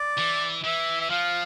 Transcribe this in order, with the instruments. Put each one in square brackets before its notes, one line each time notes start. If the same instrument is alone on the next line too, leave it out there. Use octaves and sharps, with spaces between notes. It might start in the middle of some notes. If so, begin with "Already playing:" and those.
Already playing: [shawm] D5
[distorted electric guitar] E3
[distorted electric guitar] E3 [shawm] E5
[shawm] E5
[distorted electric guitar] F3 [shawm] F5